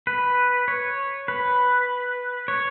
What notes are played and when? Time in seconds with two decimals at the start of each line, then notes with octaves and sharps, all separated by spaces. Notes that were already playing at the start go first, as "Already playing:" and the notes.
0.07 B4
0.68 C#5
1.28 B4
2.48 C#5